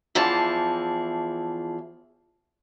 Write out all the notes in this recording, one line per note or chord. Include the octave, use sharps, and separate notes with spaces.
E2 E3 F3 G#4 A5